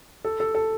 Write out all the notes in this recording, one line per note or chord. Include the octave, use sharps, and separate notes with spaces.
A4
A4
A4